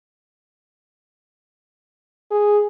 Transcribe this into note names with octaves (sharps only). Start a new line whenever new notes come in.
G#4